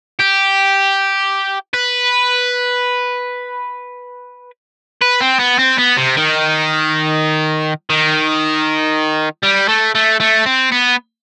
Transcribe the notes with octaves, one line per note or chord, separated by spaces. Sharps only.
G4
B4
B4
C4
B3
C4
B3
C3
D#3
D#3
G3
A3
A3
A3
C4
B3